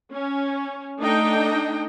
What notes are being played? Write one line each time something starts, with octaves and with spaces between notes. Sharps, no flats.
C#4
A3 D4 D#4 D#5 G5